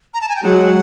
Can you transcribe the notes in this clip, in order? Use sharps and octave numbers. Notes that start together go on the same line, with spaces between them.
A#5
A5
G#5
G5
F#3 G#3 F#5